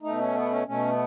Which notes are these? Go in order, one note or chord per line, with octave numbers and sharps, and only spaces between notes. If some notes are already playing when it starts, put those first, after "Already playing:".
B2 A3 D#4
C#4
B3
C#4
B2 A3 C#4
B3